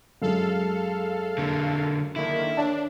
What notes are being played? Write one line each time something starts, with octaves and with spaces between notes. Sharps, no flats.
F#2 G#3 A4 F5
D3 A#3
D3 D#3 A#3 E4
D4 C#5 D5 A5